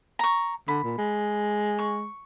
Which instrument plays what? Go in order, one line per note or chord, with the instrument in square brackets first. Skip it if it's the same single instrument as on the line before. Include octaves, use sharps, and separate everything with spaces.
[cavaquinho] A#5 C#6
[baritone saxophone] D3 [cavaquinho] B5
[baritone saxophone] A#2
G#3
[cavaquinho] C#6